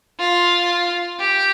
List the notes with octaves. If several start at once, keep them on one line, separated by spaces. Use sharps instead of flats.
F4
G4